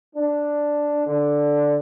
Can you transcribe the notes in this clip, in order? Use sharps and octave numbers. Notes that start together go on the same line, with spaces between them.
D4
D3